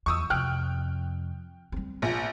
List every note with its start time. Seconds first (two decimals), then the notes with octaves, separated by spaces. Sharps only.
0.06 E2 C#6 D#6 E6
0.30 F2 C3 G5 F6 F#6
1.72 G3 C4
2.02 A#1